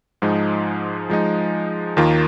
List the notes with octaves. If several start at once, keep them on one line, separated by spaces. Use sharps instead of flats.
G#2 F3 G#3 D#4
F3 G#3 D#4
D#2 D#3 A#3 F4